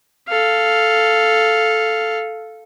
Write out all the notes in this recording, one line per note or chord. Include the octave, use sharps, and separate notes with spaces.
A4 F5